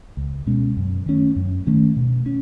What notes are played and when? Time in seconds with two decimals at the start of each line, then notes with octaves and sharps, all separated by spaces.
0.17 C#2
0.47 B2 G#3 C#4
0.77 F#2
1.06 D#3 A3 C#4
1.36 F#2
1.67 D#3 A3 C#4
1.96 B2
2.26 C#4